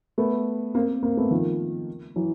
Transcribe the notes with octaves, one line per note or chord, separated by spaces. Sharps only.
A3 B3
A#3 C4
A#3 C4
A3 B3
D#3 F3
E3 F#3